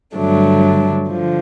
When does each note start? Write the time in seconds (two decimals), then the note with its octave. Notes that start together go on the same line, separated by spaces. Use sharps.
0.16 G2 D3 F#3 A3 D4
1.09 D3 F3